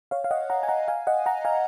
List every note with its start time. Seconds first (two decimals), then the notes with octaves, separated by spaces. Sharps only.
0.11 C#5 F5
0.24 F5
0.31 D#5 F#5
0.50 F#5 A#5
0.63 G#5
0.68 F#5 A#5
0.88 F5 G#5
1.07 D#5 F#5
1.26 F#5 A#5
1.45 F5 G#5